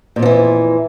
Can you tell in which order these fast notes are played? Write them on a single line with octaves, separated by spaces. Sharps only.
A#2 F2 F3 E3